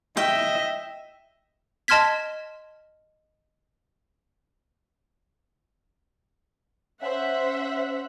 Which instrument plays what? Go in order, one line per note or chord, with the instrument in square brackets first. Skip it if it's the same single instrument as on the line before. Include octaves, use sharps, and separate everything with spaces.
[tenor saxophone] D#5 [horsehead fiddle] E5 [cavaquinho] G5
[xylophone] D#5 A5 C6 F6 G#6 B6
[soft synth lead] C#4 [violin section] C5 E5 F#5